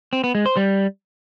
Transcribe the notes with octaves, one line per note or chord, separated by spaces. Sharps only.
C4
B3
G#3
C5
G3